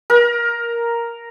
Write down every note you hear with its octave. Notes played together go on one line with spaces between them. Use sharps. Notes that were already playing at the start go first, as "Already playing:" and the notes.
A#4